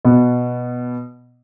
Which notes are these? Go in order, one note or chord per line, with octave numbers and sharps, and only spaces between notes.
B2 B3